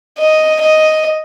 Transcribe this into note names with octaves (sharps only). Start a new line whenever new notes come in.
D#5
D#5